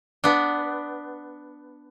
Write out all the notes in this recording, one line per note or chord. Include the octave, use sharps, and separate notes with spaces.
B3 D4